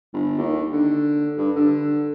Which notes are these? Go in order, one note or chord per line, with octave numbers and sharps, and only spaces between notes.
G1
D#2
D3
G2
D3